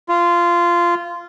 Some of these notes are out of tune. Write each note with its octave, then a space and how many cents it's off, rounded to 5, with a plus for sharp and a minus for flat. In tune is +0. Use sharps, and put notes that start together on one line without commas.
F4 -15